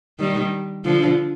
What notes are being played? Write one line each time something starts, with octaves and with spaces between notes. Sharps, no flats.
D#3 G3
D3 F3